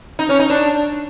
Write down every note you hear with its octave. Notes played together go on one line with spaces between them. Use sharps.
D#4
C#4
D#4
D4